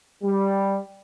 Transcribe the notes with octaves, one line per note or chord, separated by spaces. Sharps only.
G3